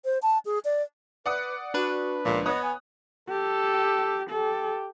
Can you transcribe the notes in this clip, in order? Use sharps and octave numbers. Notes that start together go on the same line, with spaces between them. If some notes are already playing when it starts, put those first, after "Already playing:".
C5
A5
G#4
D5
B4 D5 F#5 D#6
D4 F#4 B4
C#2 A#2 F3
B3 C#5 D#5 D#6 F#6
G#5
G4 A4
G4 A4